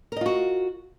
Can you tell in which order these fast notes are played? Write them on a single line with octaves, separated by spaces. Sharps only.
A#4 D#5 F4 F#4